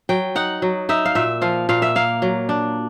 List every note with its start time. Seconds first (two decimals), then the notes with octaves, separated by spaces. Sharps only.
0.09 F#3 G5
0.35 D#4 F#5
0.62 F#3
0.89 D#4 E5
1.05 F5
1.15 A#2 E5
1.42 F3 F5
1.69 A#2 F5
1.82 E5
1.95 A#3 F5
2.22 F#3
2.49 D4